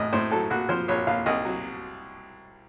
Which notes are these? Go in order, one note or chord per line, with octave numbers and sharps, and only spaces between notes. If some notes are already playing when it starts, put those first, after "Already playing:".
Already playing: A1 A2 D#5
A2 C5
F#3 A4
A#1 F#4
F3 C5
A#1 C#5
A#1 F5
C2 D#5
F#3